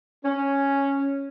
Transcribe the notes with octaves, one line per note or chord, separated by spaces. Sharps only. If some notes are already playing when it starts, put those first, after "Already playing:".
C#4